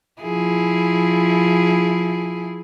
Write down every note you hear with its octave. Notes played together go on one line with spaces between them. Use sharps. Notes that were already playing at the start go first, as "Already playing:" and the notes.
F3 E4 G#4